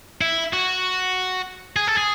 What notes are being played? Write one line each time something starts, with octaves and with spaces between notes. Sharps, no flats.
E4
F#4
G#4
A4
G#4